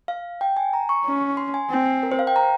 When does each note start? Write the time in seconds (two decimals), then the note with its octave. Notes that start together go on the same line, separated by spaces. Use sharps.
0.08 F5
0.41 G5
0.57 G#5
0.73 A#5
0.89 C#6
1.05 C#4
1.37 C6
1.54 G#5
1.70 C4
2.03 A#4
2.12 C5
2.19 F5
2.27 G5
2.36 A#5